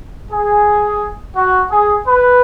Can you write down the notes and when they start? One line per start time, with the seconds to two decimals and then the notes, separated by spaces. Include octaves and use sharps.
0.32 G#4
1.36 F#4
1.71 G#4
2.07 B4